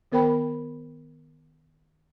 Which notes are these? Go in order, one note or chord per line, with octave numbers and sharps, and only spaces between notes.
D#3 B3 A#4 C5 G5 B5